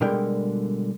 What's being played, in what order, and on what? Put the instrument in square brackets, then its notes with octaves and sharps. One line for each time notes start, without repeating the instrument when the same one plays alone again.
[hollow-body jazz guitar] B2 D3 G3 G#3 A#4 G5